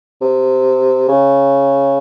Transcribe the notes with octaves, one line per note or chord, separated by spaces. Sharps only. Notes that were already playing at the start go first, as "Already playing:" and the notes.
C3
C#3